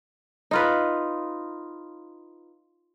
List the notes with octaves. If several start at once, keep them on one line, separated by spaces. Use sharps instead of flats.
D#4 F4 B4